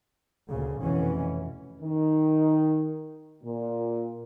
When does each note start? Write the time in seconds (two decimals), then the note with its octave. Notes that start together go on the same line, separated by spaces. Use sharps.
0.50 D2 A#2 C#3
0.83 F1 B2 E3 C#4
1.82 D#3
3.43 A#2